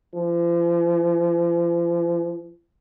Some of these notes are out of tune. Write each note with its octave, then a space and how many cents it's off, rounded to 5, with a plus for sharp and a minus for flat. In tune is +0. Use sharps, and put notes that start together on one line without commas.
F3 -40